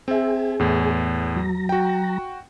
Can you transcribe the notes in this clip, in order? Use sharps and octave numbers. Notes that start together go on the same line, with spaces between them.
C4 G#4 E5
E2 A2
F#3 A#5
F#4 G5